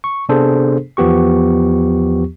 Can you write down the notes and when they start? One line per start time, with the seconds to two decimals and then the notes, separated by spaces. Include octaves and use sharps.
0.04 C#6
0.29 C3 B3 D4 G#4 A4 C5
0.97 E2 F3 B3 G4 C#6